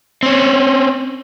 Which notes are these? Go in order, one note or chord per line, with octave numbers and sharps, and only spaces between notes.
C4 C#4